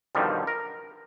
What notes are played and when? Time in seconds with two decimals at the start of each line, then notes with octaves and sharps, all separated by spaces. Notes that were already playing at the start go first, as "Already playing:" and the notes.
0.15 G2 B2 D3 D#3 F3 G3
0.47 A#4